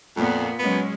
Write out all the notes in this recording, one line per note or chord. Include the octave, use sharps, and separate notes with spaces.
F2 A#2 B3
F#3 G#3 B3 C#4